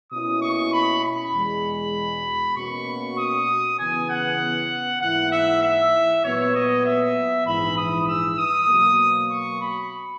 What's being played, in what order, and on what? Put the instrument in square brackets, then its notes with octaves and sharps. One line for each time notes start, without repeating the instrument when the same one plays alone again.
[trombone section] B2 A#3 C#4 E4 [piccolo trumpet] D#6
[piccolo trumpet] C#6
B5
B5
[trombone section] E2 B2 G#3
[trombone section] B2 A#3 C#4 F#4 [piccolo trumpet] C#6
[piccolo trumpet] D#6
[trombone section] C#3 E3 B3 [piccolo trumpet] G#5
[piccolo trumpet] F#5
[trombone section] G#2 E3 A#3 E4 [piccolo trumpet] F#5
[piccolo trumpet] E5
E5
[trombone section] A#2 F#3 B3 [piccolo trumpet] C#5
[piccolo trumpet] D#5
E5
[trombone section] A#1 G#2 E3 [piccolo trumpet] B5
[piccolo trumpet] D#6
E6
D#6
[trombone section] B2 F#3 A#3
[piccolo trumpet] C#6
B5